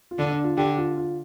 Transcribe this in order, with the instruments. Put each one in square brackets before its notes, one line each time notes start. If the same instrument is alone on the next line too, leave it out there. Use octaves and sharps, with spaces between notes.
[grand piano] F4
[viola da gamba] D3 [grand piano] D4
[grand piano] D4
F4
[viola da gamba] D3 [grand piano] G4
[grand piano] F4
F4